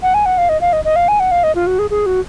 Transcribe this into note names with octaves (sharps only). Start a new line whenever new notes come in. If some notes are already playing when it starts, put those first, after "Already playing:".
F#5
G#5
F#5
F5
D#5
F5
D#5
D#5
F5
G#5
F#5
F5
D#5
F4
F#4
G#4
G#4
F#4